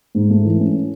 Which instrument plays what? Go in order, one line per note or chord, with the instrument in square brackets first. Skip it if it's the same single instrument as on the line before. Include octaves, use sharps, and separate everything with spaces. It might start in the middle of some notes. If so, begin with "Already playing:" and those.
[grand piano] G#2
A3
E3
C#4